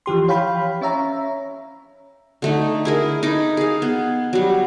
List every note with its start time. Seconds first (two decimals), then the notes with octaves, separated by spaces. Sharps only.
0.06 E3 F3 G4 C6
0.28 C#5 F5 G5 B5
0.81 C#4 C#5 E5 A#5
2.42 D3 A3 D#4
2.85 E4 G#4 A#4
3.23 D#4 B5 D6
3.57 G#4 F5
3.82 B3
4.33 F#3 G3